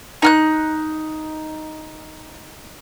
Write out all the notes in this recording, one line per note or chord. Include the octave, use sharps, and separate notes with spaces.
D#4 F6 F#6